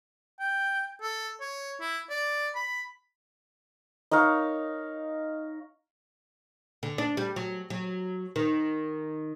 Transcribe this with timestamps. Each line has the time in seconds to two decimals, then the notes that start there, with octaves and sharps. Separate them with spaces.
0.40 G5
1.01 A4
1.41 C#5
1.80 E4
2.09 D5
2.55 B5
4.11 D#4 A#4 C#5 F5
6.83 D3
6.98 D4
7.17 G3
7.36 F#3
7.70 F#3
8.36 D#3